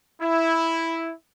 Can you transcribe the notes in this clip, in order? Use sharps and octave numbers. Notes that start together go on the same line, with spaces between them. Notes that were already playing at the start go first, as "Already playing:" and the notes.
E4